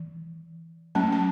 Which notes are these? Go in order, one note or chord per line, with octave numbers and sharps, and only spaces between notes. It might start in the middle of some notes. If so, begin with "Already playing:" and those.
Already playing: E3
F#3 A3 C#4 A5
A5